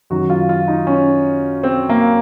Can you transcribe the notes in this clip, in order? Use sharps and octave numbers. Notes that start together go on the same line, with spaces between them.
F#2 D#3 F#3 F#4
F4
F4
D#4
C#4
C4
A#3